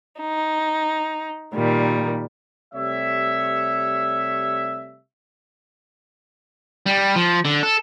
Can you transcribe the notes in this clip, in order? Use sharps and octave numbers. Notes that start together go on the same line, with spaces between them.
D#4
A#2 D#3 G3
C3 G3 A3 C#5 E5
G3
F3
D3
A4